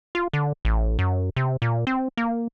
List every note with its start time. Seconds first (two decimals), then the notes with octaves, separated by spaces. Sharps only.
0.15 F4
0.33 D3
0.65 A1
0.99 F#2
1.36 C3
1.62 A#2
1.87 C4
2.17 A#3